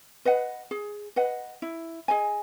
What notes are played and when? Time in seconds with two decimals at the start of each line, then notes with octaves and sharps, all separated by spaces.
0.25 B4 D#5 F#5
0.71 G#4
1.16 B4 D#5 F#5
1.62 E4
2.08 G#4 D#5 G#5